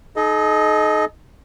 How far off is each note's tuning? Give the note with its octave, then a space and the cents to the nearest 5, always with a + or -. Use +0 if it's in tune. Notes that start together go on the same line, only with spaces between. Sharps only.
D#4 +0 A4 -45 D#5 +0